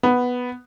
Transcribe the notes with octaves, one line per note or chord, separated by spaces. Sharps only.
B3